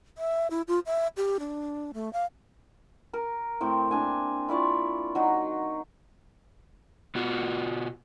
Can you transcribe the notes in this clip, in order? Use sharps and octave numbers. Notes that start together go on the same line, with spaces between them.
E5
E4
F4
E5
G4
D4
A3
F5
A#4
A2 C4 G5
A#3 D4 G#5
E4 F4 D5 C#6
F#3 D#4 F#4
B2 B3 F4 F#4